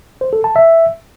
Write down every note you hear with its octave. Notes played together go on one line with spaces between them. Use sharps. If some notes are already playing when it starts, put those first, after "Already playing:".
C5
A4
A5
E5